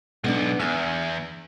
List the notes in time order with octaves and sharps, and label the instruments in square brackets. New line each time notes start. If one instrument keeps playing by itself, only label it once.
[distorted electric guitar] B1 [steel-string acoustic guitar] B3 D4
[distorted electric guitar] E2 [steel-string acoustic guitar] G#5